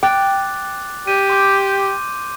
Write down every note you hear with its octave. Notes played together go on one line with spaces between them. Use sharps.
G5 D6 F#6 A6
G4 D#7
C6 D6 G6